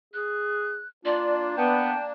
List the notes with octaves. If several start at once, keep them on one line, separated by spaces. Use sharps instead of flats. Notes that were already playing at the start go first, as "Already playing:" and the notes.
G#4 F#6
A#3 D4 F4 D5
B3 G5 A5